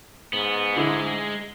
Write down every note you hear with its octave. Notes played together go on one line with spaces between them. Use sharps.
G#2 B3
D3 G#3 E4